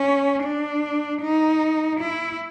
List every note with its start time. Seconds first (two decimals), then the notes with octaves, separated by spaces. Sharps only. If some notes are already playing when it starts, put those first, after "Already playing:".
Already playing: C#4
0.43 D4
1.22 D#4
2.00 E4